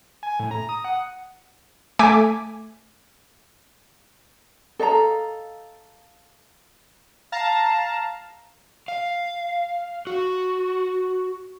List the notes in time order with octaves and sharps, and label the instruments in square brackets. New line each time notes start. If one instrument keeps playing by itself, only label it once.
[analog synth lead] G#5
A2
A#5
D#6
F#5
[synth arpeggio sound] A3 G#5 D6 B6
[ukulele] A4 D#5 F5 A#5
[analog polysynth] F5 A5 A#5
[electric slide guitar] F5
F#4